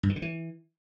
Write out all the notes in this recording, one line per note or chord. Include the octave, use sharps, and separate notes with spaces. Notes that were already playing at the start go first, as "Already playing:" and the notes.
G2
D#3
D3
E3